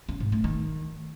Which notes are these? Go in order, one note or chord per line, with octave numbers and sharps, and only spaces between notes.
C#4
G#2
A3
D#3